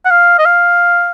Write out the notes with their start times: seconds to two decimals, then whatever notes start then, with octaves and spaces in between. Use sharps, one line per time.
0.05 F#5
0.10 F5
0.39 D#5
0.45 F5